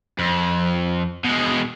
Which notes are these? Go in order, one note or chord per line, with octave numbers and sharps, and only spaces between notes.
F2
B2 G#3